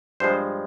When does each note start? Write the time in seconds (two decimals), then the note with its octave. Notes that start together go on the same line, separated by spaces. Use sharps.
0.20 G2 F3 G#3 C5